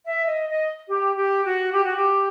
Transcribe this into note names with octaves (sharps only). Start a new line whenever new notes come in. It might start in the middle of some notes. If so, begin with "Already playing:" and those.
E5
D#5
D#5
G4
G4
F#4
G4
F#4
G4